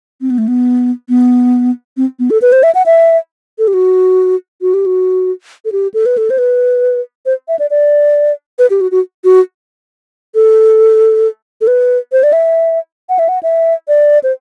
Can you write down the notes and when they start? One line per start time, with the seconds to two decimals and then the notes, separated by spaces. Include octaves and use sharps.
0.21 C4
0.30 B3
0.38 A3
0.48 B3
1.09 B3
1.97 C4
2.20 B3
2.30 A4
2.42 B4
2.52 C5
2.63 E5
2.75 F#5
2.86 E5
3.59 A4
3.68 G4
3.74 F#4
4.62 F#4
4.74 G4
4.86 F#4
5.65 A4
5.72 G4
5.94 A4
6.06 B4
6.18 A4
6.30 C5
6.38 B4
7.26 C5
7.48 E5
7.59 D5
7.70 D5
8.59 B4
8.70 G4
8.81 F#4
8.91 F#4
9.24 F#4
10.35 A4
11.61 A4
11.67 B4
12.12 C5
12.23 D5
12.33 E5
13.09 F#5
13.19 E5
13.29 F#5
13.43 E5
13.88 D5
14.23 C5